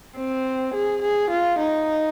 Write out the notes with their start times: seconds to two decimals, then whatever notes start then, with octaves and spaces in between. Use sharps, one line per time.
0.17 C4
0.74 G#4
1.02 G#4
1.30 F4
1.59 D#4